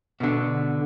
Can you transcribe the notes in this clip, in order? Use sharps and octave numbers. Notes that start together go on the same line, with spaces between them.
B2 D3